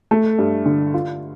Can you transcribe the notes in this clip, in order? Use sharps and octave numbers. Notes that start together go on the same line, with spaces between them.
A3
G2
D3
F4